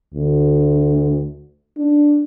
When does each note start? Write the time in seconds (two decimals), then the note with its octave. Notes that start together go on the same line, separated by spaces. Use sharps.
0.14 D2
1.78 D4